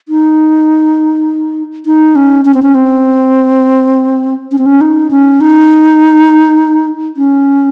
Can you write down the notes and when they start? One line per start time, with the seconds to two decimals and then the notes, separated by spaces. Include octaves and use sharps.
0.09 D#4
1.86 D#4
2.16 C#4
2.45 C#4
2.54 C4
2.62 C#4
2.75 C4
4.52 C#4
4.58 C4
4.66 C#4
4.81 D#4
5.11 C#4
5.41 D#4
7.17 C#4